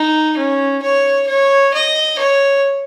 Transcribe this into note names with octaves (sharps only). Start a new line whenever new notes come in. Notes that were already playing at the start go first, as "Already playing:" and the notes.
Already playing: D#4
C#4
C#5
C#5
D#5
C#5